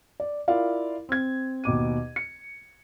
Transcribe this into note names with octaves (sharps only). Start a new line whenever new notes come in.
D5
E4 F4 A#4 D5 F5
C4 G#6
D#2 B2 D6 D#7
C#7